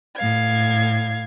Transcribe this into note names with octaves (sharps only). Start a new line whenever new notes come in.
A2 F5 G#6